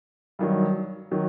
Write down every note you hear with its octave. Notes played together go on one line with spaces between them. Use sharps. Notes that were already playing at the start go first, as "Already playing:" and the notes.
G2 D#3 F#3
D#3 F#3